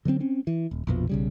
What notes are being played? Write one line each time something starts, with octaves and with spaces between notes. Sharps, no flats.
D3 F#3 G#3 C4
C4 C#4
E3
D#1
A#1 F2 B2 F3
B1 C#3 G3